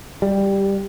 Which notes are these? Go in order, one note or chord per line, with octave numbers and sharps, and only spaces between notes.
G3